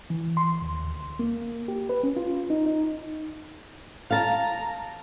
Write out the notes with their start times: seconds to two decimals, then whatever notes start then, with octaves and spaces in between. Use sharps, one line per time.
0.10 E3
0.37 C6
0.62 D#2
0.85 D2
1.19 A#3
1.68 G4
1.89 B4
2.03 C#4
2.16 F4
2.50 D#4
2.66 D#4
4.10 F5 A5 A#5